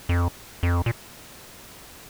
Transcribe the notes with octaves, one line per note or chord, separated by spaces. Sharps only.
F2
F2
A#2